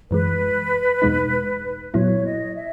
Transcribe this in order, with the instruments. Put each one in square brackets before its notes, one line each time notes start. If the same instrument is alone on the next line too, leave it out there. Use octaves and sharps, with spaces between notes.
[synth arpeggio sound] F#2 E3 G#3 [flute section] B4
[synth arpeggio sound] E2 B2 G#3 D#4
[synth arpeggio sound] A#2 F#3 B3 E4 [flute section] C#5
[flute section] D#5
E5